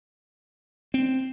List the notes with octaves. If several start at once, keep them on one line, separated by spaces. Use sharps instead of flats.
C4